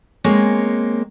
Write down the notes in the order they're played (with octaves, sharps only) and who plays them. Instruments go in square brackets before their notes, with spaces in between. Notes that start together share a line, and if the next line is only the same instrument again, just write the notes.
[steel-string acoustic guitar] G#3 A#3 C4 C#5